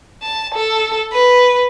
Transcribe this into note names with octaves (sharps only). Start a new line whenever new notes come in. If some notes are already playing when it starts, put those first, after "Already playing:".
A5
A4
B4